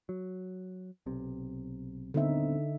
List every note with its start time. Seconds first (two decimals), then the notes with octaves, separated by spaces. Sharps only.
0.09 F#3
1.06 B1 C3
2.14 D#1 D3 B3 C4 D#4 E5